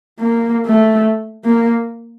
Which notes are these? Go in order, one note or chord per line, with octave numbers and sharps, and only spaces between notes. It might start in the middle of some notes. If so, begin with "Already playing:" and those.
A#3
A3
A#3